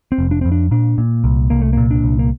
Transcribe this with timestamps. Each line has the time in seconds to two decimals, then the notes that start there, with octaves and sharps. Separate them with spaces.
0.12 C4
0.18 F1
0.31 D4
0.41 F2 C4
0.52 D4
0.71 A#2 D4
0.98 A#2
1.24 C2
1.50 C2 A#3
1.62 A3
1.73 A#2 A#3
1.91 D4
2.03 C2
2.19 A#3